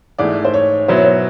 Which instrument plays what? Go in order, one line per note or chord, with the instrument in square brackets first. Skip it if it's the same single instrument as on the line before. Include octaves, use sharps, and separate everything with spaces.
[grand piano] G#2 E3 A3 [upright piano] D5
[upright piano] C5
C#5
[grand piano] B2 F#3 B3 E4 [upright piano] C5
[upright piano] C#5
C5